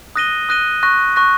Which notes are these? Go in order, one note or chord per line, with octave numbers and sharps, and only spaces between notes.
D#6 F#6 A#6 D#7 G7
D#6 F#6 A#6 D#7 G7
C#6 F#6 A#6
C#6 F#6 A#6